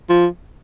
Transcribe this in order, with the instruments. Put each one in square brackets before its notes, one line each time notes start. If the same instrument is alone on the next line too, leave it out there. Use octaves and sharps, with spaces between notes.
[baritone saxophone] F3